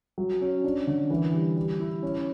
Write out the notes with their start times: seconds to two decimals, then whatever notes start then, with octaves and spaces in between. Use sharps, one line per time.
0.18 F#3
0.41 C#4
0.64 D4
0.87 D3
1.10 E3
1.34 G3
1.56 G3
1.80 E4
2.03 C#4